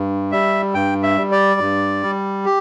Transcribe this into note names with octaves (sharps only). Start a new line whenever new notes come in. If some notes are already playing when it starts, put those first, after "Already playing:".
Already playing: G2
G3 E5
G2 G5
E5
G3
D5
G2
G3
G4